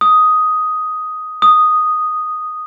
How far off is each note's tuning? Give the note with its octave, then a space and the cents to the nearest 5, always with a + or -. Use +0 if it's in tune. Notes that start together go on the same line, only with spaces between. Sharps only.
D#6 +5
D#6 -5